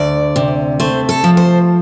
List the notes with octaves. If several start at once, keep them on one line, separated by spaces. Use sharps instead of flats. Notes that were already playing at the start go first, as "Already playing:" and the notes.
Already playing: D2 D5
C3
A3 C5
A4
F3
C5